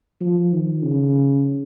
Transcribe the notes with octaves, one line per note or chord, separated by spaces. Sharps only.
F3
D#3
C#3